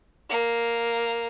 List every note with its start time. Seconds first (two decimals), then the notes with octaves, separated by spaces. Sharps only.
0.29 A#3